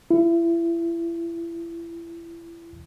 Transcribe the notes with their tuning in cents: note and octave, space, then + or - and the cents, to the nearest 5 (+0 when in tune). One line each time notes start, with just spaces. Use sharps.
E4 +30